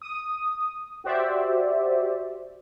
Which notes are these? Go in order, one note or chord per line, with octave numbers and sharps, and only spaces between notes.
D#6
F#4 G4 C5 D5 E5